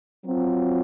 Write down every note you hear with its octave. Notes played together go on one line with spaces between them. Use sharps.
F#3 C4 F4